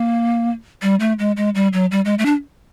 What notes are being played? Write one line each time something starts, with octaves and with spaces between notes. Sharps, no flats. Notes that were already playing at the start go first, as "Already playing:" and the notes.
Already playing: A#3
G3
A3
G#3
G#3
G3
F#3
G3
G#3
A3
D4